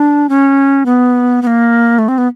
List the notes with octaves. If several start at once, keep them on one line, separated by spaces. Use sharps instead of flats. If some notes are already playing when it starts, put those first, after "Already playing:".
Already playing: D4
C#4
B3
B3
A#3
A3
C4
B3